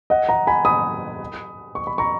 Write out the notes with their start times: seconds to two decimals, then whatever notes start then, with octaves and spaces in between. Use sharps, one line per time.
0.10 D#5 F#5
0.29 F#5 A#5
0.47 G#5 B5
0.65 B5 D#6
1.75 C#6
1.87 B5
1.98 A#5 C#6